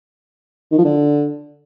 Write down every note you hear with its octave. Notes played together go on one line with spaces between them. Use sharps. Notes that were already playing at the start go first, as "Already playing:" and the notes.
D#3
F3
D3